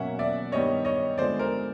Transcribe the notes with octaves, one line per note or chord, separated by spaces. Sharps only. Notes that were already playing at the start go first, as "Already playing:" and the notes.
Already playing: B2 F#3 A#3 C#4 E5 F#5
D5 E5
G2 D#3 G3 B3 C#5 D#5
C#5 D#5
D3 F3 G#3 B3 C5 D5
A#4 C5